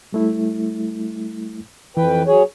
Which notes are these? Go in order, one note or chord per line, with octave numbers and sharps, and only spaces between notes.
G3 A3 E4
F2 E3 B4 G5
F#3 G#4 C#5